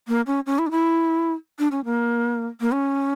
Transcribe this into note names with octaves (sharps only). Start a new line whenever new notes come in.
A#3
C#4
C#4
E4
D4
E4
D4
C#4
A#3
A#3
C#4